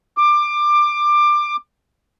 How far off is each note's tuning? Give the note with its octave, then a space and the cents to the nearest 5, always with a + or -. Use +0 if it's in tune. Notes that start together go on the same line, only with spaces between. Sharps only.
D6 +20